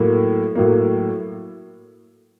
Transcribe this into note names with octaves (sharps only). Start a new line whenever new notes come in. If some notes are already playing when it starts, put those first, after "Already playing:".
Already playing: A2 F#3 A#3
A2 F#3 A#3